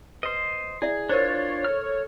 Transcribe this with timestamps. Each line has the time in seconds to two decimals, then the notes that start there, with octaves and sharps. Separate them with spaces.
0.23 B4 C5 D#5
0.82 E4 G#4 D5 E5
1.09 D4 F4 A#4 C5 C#5
1.65 A4 F6